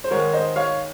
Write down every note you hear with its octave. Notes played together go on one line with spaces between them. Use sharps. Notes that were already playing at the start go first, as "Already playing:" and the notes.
C5
G#2 D#3 G#3 A#4 C#5
C5 D#5
C#5 F5